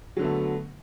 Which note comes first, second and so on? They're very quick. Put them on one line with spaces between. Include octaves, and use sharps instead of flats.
F#3 D3 B3 A3